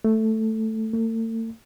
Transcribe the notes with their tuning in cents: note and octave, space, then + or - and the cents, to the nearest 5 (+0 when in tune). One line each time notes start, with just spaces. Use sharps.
A3 +0
A3 +40